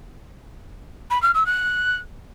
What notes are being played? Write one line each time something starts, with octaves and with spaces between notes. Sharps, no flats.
B5
F6
E6
F#6